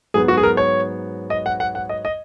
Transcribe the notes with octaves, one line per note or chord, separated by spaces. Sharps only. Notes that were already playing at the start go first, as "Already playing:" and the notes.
G#2 F#3 B3 G#4
F#4
G#4
A#4
C#5
D#5
F#5
F#5
F#5
D#5
D#5